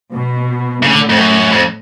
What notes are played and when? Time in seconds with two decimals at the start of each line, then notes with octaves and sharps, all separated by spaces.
0.12 B2
0.83 A2 C#3
0.91 D3
1.09 F2
1.17 F#2
1.52 F2